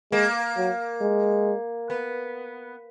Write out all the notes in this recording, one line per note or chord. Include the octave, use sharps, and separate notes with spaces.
G#3 A#3
F#3
G#3
B3